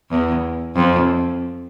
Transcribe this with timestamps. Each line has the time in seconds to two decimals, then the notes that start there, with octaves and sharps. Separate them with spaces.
0.11 E2
0.76 F2